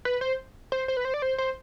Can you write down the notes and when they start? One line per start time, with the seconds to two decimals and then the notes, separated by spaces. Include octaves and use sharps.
0.05 B4
0.21 C5
0.72 C5
0.88 C5
0.97 B4
1.05 C5
1.14 D5
1.22 C5
1.38 C5